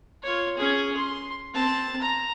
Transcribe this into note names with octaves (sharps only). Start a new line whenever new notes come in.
F4 C#5
C#4 G#4
C6
C4 A5
A#5